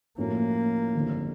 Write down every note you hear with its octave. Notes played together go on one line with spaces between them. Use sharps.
A2 F3 A3 A#3 C#4 F#4
G1 F2 D3